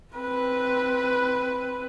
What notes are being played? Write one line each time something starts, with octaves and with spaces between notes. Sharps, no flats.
C4 B4